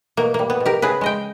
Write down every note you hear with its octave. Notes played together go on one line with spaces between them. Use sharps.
B2 A#3
G3 A#3
B3
B2
G4 A#4
C#3 G#4 B4
G#3 D#5 G5